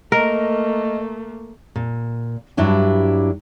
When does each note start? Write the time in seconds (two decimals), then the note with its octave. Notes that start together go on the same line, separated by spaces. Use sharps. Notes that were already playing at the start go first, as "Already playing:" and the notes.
0.12 A3 A#3 A#4 D#5
1.76 A#2
2.57 G2 F#3 D4 E4 G4